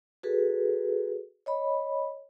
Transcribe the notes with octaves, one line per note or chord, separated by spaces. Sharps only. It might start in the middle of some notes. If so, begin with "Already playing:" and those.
F#4 G#4 A4 B4
C#5 D#5 B5